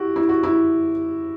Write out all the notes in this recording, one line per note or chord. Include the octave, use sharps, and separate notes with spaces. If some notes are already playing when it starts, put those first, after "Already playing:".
Already playing: E4 F#4 G4
E4
F#4
E4